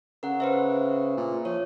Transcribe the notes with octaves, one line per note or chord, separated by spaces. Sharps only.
C#3 A#4 F#5
B4 C5 E5
A#2
F3 C#5